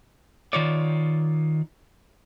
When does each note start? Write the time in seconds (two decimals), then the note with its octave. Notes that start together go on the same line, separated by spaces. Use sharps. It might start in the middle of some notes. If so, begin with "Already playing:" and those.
0.53 D#3 F4 C#5 D5